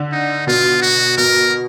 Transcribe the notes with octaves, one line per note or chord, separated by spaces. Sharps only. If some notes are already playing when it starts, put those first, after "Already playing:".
Already playing: D3
D#4
B2 F4
F#4
B2 A#4